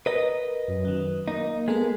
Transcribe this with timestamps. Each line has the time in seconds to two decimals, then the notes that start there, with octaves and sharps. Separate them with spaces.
0.06 A#4 B4 D#5
0.68 F#2
0.85 D#3 F#3
1.28 A#3 D#4
1.68 G#3 B3 A4 A#4